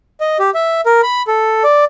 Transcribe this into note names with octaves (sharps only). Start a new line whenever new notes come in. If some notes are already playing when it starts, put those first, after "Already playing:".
D#5
G4
E5
A#4
B5
A4
D5